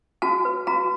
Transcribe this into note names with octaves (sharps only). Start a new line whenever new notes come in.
F#4 A5
B4
F#4 A#5